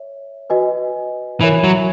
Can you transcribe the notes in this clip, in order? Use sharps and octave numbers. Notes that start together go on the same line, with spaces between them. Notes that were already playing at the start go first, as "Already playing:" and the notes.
Already playing: C#5 E5
F#4 B4 D#5 G#5
E3 A#4 C#5 E5 G#5 B5
F#3